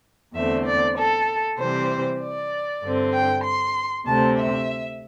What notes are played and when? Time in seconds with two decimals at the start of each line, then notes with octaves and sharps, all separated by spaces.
0.34 E2 D3 A3 C4 E5
0.65 D5
0.96 A4
1.58 C3 E3 G3 C4 C5
2.20 D5
2.82 G2 D3 C4
3.13 G5
3.44 C6
4.06 D2 C3 A3 C4 A5
4.37 E5